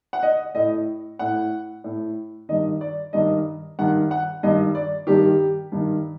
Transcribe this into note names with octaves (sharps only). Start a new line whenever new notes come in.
F#5
D#5
A2 D#5
A2 F#5
A2
G2 D#3 D#5
D5
G2 D#3 D#5
G2 D#3 F#5
F#5
G2 D#3 D#5
D5
G2 D#3 G4
G2 D#3